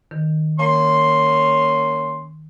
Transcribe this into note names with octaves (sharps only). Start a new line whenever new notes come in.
D#3
A#3 C#4 C6